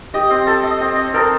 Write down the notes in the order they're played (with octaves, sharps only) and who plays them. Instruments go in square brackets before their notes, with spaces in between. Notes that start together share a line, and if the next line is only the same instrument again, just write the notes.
[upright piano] G4 [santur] D#5
[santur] C4
A4
D#5
C4
D#5
[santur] A4 [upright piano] A#4